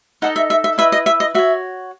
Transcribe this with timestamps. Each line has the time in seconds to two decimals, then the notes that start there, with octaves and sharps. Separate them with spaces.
0.22 D#4 A4 D#5 F#5
0.36 E5
0.50 E5
0.64 E5
0.78 E4 B4 D#5 E5
0.92 D#5
1.06 E5
1.20 D#5
1.35 F#4 C#5 E5